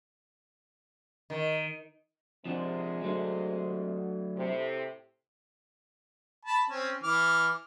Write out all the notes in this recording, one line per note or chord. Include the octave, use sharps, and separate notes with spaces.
D#3
C3 F3 G#3 C4 D4
F#3 A3 D4
A2 C3
A5 B5
C4 C#4
E3 D6 F6